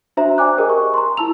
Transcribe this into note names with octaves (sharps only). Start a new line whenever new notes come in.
D4 F#4 C5 E5 A#5
D5 G5 G#5 D6 F#6
G4 G#4 A#4 D#5
C#6
A#5 C6
E4 A5 E6 F7